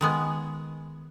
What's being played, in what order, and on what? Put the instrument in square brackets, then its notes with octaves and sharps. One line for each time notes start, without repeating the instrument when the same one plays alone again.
[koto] D#3 G#3 B3